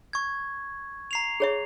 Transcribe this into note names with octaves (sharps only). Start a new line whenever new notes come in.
C#6 G#6
A#5 C7 F7
G#4 C#5 E5